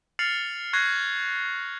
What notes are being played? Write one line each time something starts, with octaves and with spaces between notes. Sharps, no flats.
F6 A6 C7 C#7 F7 F#7
C#6 F#6 G#6 A#6 C7 C#7